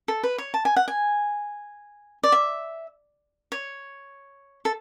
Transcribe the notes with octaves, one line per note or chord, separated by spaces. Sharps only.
A4
B4
C#5
A5
G#5
F#5
G#5
D5
E5
C#5
A4